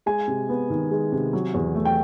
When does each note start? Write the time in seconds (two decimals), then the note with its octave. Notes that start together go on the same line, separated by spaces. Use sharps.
0.06 G#3 G#5
0.28 C3
0.49 B3
0.70 D#3
0.91 G#3
1.12 C3
1.33 F#3
1.54 E2
1.75 A3
1.85 G5